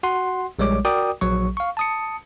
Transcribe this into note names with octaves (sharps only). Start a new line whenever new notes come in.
F#4 F#5 C6
A#1 G3 G#3 C#5 D6
F#4 A#4 D5 G5 D6 D#6
A#1 F#3 C#6
F5 C#6
A5 D#6 C#7